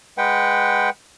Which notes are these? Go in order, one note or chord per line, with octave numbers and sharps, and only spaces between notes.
G#3 B4 F#5 G5